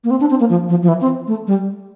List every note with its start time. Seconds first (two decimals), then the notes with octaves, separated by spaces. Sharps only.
0.04 A#3
0.11 C4
0.21 D4
0.30 C4
0.40 A#3
0.50 F3
0.69 F3
0.83 F3
0.88 E3
1.01 C4
1.27 A3
1.47 G3